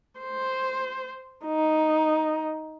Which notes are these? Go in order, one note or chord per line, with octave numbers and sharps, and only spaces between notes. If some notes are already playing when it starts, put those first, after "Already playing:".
C5
D#4